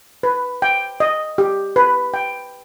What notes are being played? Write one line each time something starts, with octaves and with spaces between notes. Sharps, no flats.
B4
G5
D#5
G4
B4
G5